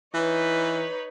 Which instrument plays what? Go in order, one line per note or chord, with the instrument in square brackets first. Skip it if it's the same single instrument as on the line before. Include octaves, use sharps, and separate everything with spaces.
[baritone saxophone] E3 [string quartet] D#4 B4 C#5